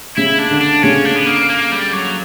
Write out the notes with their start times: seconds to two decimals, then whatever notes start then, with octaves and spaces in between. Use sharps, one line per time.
0.17 C#3 E4
0.39 D4
0.51 D3
0.61 D4
0.83 C#3 C#4
1.06 D4
1.17 B3
1.27 A#3
1.50 A#3
1.72 G3
1.93 F#3